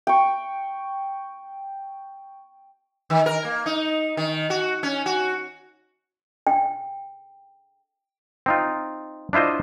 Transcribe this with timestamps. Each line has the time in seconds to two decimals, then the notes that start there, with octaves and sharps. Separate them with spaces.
0.07 G5 C#6
3.10 D#3
3.26 A#4
3.45 A#3
3.66 D#4
4.17 D#3
4.50 F#4
4.83 C#4
5.06 F#4
6.47 G5
8.46 C4 D#4 F4
9.33 D4 E4 F4 C5 D#5